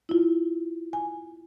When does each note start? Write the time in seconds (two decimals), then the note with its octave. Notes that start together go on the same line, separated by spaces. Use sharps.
0.09 E4 F4
0.93 G#5